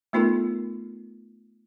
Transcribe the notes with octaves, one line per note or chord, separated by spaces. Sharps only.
A3 B3 D#4 F4 A4 A#4